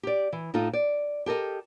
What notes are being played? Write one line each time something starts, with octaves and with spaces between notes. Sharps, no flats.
G4 D5
E3
A2 D#4 F4 A4
D5
G4 A4 A#4 D#5